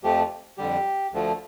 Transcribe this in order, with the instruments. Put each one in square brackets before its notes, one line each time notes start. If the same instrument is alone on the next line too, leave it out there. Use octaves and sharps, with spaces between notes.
[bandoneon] F2 F3 A3 G4
F2 D3 G3 G4
D2 D3 F3 A3